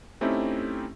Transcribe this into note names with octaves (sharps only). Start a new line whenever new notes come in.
A3 C4 C#4 D#4 E4 G4